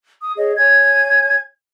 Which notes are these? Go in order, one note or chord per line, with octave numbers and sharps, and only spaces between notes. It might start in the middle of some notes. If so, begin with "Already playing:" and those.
D#6
G#4 C#5 D#5
C#5 G#5 G#6